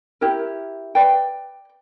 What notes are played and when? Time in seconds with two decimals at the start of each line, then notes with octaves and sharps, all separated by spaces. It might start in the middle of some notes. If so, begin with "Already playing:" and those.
0.21 E4 G4 A#4
0.95 B4 D5 G5